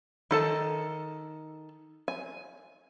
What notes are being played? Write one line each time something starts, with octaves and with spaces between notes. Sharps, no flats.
D#3 A4 A5
G#5